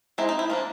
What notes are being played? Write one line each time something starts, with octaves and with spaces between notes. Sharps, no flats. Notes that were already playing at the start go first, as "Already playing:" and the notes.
G#3 C4 D#4 E4
D#4
E4
F3 A#3 D4 F4